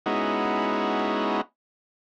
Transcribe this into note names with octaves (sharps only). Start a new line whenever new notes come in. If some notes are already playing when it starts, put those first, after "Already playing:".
G#3 B3 C#4 D#4 E4 F#4